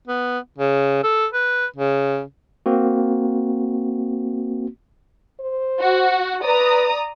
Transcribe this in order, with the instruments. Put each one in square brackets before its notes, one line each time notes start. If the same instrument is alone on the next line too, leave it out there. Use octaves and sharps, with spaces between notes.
[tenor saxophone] B3
C#3
A4
B4
C#3
[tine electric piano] A#3 C4 F#4
[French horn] C5
[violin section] F#4 F#5
[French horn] B4 [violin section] D5 A#5 D#6